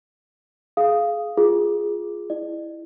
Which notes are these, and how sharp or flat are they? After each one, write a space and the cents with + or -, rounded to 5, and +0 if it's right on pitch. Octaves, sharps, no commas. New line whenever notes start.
G#4 +25 F5 -10 D#6 +0
F4 +0 G#4 +0
E4 +0 D5 +45